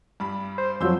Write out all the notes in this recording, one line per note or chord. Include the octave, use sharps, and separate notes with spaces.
G2 G3 B5
C5
F2 F3 F#3 C6 E6 G6